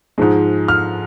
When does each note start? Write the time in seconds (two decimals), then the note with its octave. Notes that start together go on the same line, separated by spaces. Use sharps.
0.18 G#2 F3 G#3
0.68 F6